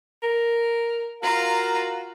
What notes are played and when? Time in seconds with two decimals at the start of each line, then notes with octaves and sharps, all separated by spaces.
0.23 A#4
1.23 F4 F#4 A#4 F5 A#5